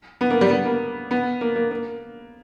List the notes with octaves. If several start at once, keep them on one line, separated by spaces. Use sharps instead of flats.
B3
A#3
G3
B3
A#3
B3
A#3
A#3
A#3